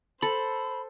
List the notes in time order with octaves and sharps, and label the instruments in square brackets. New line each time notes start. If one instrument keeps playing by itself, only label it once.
[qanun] A4 [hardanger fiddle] C5 [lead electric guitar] B5